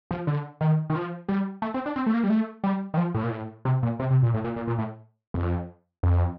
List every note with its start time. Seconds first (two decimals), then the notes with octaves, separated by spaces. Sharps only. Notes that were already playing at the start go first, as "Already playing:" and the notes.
0.11 F3
0.27 D3
0.61 D#3
0.90 D#3
0.96 F3
1.29 G3
1.62 A3
1.74 C4
1.86 D4
1.96 C4
2.06 A3
2.14 A#3
2.23 G3
2.30 A3
2.64 G3
2.94 D#3
2.97 F3
3.14 A2
3.23 A#2
3.31 A2
3.65 C3
3.83 A#2
4.00 C3
4.11 C3
4.23 A#2
4.34 A2
4.44 A#2
4.56 A#2
4.67 A#2
4.78 A2
5.34 F2
6.03 F2